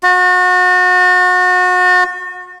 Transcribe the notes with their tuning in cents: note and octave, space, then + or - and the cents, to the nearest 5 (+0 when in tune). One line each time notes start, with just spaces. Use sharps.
F#4 -30